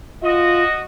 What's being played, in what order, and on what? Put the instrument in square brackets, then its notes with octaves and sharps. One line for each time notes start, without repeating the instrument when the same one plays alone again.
[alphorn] F4 [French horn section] F#4 D#5